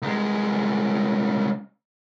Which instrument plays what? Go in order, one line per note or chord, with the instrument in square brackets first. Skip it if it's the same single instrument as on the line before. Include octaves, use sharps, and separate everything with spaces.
[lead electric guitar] C2 G#3